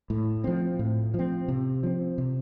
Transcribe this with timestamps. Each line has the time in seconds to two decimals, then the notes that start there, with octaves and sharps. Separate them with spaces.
0.10 A2
0.44 F3 C4
0.79 A2
1.14 F3 C4
1.48 C3
1.83 F3 C4
2.18 C3